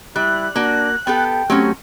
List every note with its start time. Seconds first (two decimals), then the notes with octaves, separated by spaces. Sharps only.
0.16 G3 E4 F#6
0.56 A#3 D4 F#4
1.07 B3 G4 A4 G5
1.50 F#3 A3 C4 C#4 G4